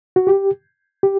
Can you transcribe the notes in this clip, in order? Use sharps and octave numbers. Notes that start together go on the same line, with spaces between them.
F#4
G4
G4